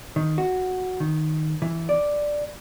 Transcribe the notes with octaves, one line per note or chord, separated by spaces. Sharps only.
D#3
F#4
D#3
E3
D5